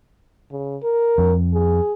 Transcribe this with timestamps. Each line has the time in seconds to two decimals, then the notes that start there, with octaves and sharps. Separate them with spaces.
0.51 C#3
0.83 A#4
1.18 F2
1.54 G#4